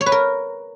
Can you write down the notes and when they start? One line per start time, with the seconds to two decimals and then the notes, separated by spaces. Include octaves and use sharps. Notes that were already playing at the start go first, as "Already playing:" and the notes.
0.01 C#5
0.06 B4
0.12 A#4